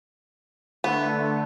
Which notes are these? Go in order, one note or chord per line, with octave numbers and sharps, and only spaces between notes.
D3 A3 B3